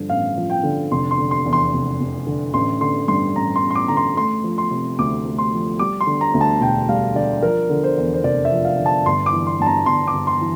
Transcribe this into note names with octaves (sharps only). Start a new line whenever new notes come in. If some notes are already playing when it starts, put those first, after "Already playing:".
Already playing: G2 D3 F3
A1 F5
F3
G5
D3
F1 C6
C6
D3
C6
E2
C6
F1
F1
D3
A1 C6
D3 C6
G2 C6
A1 A#5
C6
A1
C6
D6
D3 A#5
C6
A3 C6
F3
C6
C3
D2 D6
A3
C6
F3
G3 D6
C6
D3
A#5
D2
A5
E1 G5
G3 F5
D3 D5
F3 A#4
D3
C5
E2
C5
F1 D5
E5
F3
F5
D3
A5
G1 C6
D6
E3
C6
G2 A5
A#5
G1 C6
D6
G1
C6
E3